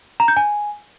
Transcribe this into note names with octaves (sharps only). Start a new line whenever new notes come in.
A#5
G6
G#5